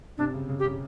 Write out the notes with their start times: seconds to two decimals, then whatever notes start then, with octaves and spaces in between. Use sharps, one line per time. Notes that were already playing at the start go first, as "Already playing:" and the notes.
0.18 C3 D4
0.34 C#3
0.49 C#3
0.59 G4
0.64 C#3